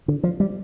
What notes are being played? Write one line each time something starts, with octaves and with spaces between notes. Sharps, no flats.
D3
F3
G3